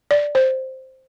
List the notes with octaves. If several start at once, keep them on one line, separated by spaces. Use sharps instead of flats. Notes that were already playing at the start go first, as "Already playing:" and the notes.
D5
C5